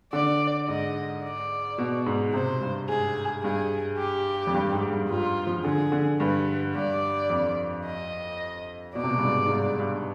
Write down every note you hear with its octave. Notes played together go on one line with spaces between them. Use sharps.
D3 D5
G#2 D#5
D5
B2
G#2
C3 C5
G2
G#2 G#4
G2 G#4
G4
F2
G2
G#2
G2
G2 F4
F3
D3 G#4
D3
G2 B4
G2 D5
F2
D#5
B2 D5
C3
B2
G2
G#2
G#2
G2
G2